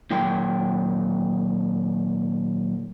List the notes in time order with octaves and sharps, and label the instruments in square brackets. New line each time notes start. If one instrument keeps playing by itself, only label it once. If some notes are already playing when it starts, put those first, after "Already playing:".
[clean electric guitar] A#2 D#3 F#3 A#4 G5 C6